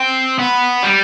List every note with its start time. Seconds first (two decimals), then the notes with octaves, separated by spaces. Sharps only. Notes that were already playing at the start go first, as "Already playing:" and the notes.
Already playing: C4
0.39 B3
0.83 G3